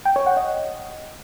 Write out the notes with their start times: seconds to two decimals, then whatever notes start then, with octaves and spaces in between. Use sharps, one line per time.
0.05 G5
0.16 C#5
0.26 F#5
0.37 D#5